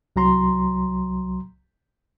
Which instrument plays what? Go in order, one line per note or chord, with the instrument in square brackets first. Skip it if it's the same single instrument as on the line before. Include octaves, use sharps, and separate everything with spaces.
[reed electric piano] C2 F#3 A#5 C6